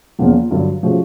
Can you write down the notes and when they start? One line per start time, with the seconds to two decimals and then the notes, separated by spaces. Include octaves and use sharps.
0.19 E2 C#3 F3 A#3 F4
0.51 G2 D3 F#3
0.83 C#3 F3 A3 F#4